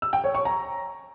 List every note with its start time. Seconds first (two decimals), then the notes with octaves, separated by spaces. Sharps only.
0.02 E6
0.13 G5
0.24 C#5
0.35 C#6
0.45 A#5